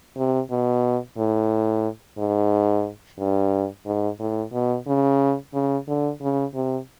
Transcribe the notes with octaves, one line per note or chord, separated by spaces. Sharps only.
C3
B2
A2
G#2
G2
G#2
A2
B2
C#3
C#3
D3
C#3
C3